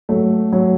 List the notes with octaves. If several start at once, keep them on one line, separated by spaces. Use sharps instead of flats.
F#3 A3
F#3